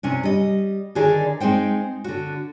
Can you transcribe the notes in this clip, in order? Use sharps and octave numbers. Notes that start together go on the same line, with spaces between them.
C3 C#4 D4
G3 D#5
D3 D#3 D4 G#4 A#4 D5
G#3 C4 D#4 C5 G5
D3 F#4